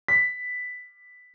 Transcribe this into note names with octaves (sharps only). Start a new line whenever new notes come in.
B6